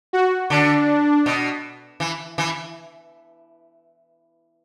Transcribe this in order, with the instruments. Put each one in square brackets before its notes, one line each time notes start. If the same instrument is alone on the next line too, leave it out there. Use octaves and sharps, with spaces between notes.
[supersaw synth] F#4
[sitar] D3 [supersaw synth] D4
[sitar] B2
E3
E3